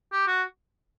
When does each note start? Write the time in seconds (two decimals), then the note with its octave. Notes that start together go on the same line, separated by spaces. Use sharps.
0.13 G4
0.27 F#4